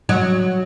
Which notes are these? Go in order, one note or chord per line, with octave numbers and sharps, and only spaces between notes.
F#3